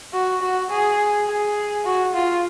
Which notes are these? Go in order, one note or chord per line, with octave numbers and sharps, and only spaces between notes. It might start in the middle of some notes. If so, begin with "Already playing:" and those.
F#4
F#4
G#4
G#4
F#4
F4